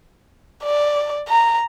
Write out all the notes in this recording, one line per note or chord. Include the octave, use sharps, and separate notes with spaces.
D5
A#5